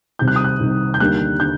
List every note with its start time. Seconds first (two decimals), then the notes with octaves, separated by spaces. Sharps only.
0.19 C2 C3 D#3 G6
0.28 F#6
0.36 D#6
0.44 F#6
0.60 C2 C3 D#3
0.94 G6
1.00 D#2 D3 G3 A#3 F#6
1.40 D3 G6